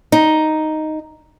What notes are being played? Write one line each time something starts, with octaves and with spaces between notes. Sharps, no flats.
D#4